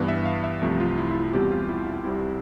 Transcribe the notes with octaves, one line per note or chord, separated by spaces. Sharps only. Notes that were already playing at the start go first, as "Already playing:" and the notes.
Already playing: G2 E3 B3 D5
E5
F5
E5
C2 C3 F3 A3
F4
E4
E4
F4
E2 B2 G3 C4 G4
F4
E4
F4
C2 C3 G3 C4 E4